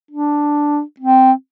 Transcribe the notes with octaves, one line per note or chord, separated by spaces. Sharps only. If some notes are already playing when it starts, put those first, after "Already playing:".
D4
C4